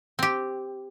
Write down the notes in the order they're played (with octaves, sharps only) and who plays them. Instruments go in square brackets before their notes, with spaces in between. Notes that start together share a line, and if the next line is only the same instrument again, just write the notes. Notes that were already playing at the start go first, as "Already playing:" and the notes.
[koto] C4 G4